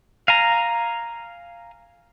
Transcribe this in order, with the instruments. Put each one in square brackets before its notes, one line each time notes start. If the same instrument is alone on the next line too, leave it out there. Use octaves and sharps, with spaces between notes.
[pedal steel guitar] F5 G#5 A#5